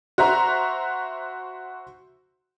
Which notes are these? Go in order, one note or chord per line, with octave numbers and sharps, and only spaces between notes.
F#4 C5 E5 A#5